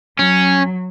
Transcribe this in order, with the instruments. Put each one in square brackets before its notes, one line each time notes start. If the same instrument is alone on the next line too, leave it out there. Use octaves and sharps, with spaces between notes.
[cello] F#3 [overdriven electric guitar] C#4